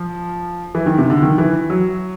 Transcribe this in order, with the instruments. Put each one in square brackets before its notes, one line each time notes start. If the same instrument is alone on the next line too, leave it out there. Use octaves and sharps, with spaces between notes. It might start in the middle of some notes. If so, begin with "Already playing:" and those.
Already playing: [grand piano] F3
E3
D#3
C3
D3
D#3
E3
F#3